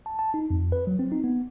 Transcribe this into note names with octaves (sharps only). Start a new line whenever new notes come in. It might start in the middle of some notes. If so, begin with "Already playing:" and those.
A5
A5
D#4
F2
B4
F#3
C4
D#4
B3